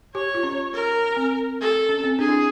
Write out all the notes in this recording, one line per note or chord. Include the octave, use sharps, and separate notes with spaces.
G4 C#5
F4
C#4
A#4
C4
A4
C#4
C4
D4 G#4
E4